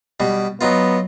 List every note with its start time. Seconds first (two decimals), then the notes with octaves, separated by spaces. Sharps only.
0.20 B2 G3
0.61 F#3 B3 D#4 F4